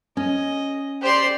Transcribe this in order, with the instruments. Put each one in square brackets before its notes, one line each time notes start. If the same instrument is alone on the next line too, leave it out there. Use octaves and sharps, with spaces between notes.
[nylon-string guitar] C#4 [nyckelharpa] D#5
[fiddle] G4 C6 [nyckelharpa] C5 D5